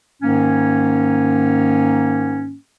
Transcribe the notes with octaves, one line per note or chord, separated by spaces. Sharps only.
G#2 D#3 A#3 C#4